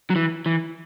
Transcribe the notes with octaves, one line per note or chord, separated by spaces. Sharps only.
F#3
E3
E3